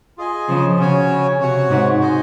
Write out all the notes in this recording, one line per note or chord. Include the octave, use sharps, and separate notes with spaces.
F4 G#4 D#5 G#5
C#3 F3
C#3 C#4 F#4 C#5 G#5
C#3
C3 F#4 C#5 F#5
G#2
F#4 C5 D#5 G#5